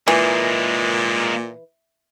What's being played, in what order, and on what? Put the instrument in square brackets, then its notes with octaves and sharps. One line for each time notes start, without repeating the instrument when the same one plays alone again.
[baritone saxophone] A#2 [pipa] E3 [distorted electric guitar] G#3 A#3